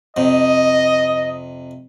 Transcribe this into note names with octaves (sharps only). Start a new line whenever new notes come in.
F2 C3 D#5